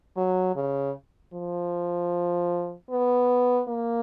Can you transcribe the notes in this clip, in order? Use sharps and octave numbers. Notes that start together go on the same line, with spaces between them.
F#3
C#3
F3
B3
A#3